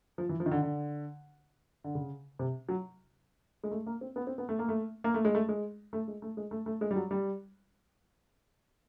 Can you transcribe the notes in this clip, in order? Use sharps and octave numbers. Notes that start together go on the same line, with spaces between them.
F3
E3
F3
D#3
D3
D3
D3
C#3
C3
F#3
G#3
A3
A#3
C4
B3
C4
B3
A3
A#3
A3
A#3
A3
G#3
A3
G#3
A3
G#3
A3
G#3
A3
A3
G#3
G3
F#3
G3